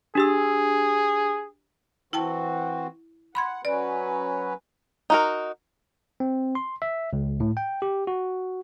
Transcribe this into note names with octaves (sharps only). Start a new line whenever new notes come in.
D4 G4 G#4 E6
E3 C4 E4 F#4 G5 A5
F#5 B5 C6 G#6
F#3 C#4 B4 D5
D#4 F#4 A#4
C4
C6
E5
C#2
A2
G5
G4
F#4